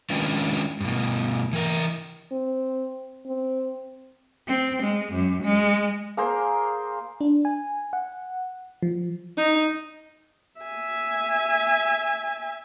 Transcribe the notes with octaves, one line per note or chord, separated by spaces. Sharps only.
D#3 G#3 C#4 D4 F4 B4
G2 B2
E3 A#4
C4
C4
C4
G#3
F#2
G#3
A#3 G#4 A#4 C5
D4
G#5
F#5
F3
D#4
E5 G#5